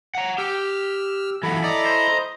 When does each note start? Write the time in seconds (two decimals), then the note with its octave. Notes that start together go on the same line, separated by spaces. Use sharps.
0.15 F#5 A#5
0.38 G4 E6 F6
1.43 E3 F#3 E4 A4 B5
1.64 D5 D#5 A#5
1.86 C5